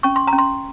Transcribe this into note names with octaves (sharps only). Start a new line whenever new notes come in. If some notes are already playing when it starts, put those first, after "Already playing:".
C#4 C#6
C6
A#5
C#4
C6